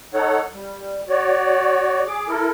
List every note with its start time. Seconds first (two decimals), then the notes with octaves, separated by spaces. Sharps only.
0.14 D#4 A4 C#5 F#5
0.54 G3
1.08 F#4 C#5 D5
2.07 G#4 D6
2.28 E4 A4 A#4